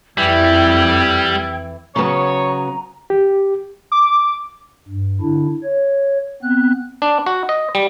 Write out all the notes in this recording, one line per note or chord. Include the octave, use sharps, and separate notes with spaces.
F2 E3 G3 G5 E6 G#6
C#3 F#3 B3 C#5 A#5
G4
D6
G2
D3 D4 E4
C#5
B3 C4 F#6
D4
F#4
D#5
G3